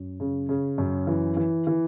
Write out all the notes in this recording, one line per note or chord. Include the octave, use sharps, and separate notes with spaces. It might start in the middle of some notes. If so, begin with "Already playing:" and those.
Already playing: F#2
C#3
C#3
F#2
E3
E3
E3